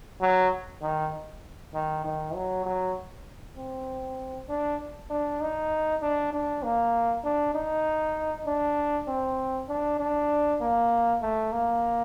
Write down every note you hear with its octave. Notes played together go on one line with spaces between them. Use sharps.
F#3
D#3
D#3
D#3
F#3
F#3
C4
D4
D4
D#4
D4
D4
A#3
D4
D#4
D4
C4
D4
D4
A#3
A3
A#3